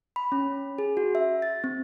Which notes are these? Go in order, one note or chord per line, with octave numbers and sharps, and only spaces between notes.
B5
C#4
G#4
F#4
E5
A6
C4